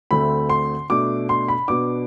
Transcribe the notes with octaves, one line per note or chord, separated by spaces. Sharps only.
D2 D3 A3 C4 B5
C6
B2 A3 D4 D6
C6
B5
B2 B3 D4 D6